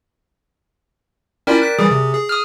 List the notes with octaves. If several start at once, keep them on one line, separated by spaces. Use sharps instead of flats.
C#4 E4 F4 A#4 D5 G5
F#6 B6
E3 G3 G#4
C3
G#4
D#6 F6